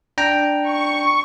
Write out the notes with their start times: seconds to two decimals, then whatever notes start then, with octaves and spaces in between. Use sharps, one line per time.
0.18 D4 G5 A#5
0.68 C#6